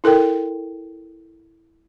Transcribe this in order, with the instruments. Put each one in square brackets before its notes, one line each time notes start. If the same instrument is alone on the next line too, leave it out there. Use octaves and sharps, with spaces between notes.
[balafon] E4 A4 A#4 G5